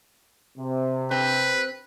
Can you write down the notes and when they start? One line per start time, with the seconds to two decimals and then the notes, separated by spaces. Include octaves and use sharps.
0.57 C3
1.11 C4 B4